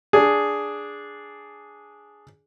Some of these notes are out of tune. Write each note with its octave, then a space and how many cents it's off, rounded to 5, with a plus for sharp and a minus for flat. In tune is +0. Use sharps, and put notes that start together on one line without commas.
D4 -5 G#4 +0